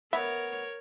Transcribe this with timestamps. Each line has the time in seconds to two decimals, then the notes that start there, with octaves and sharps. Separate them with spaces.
0.13 B3 A#4 C#5 E5